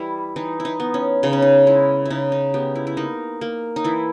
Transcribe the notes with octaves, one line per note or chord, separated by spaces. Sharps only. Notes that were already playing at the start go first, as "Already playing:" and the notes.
Already playing: E3 G3 E4
E3 D#4
E4
D#4
B3
C#4
C#3 D#4
C#4
D#4
G#3 E4
C#3 D#4 E4
D#4
B3 G4
E4
E4
A#3 D#4
A#3
D#4
E3 E4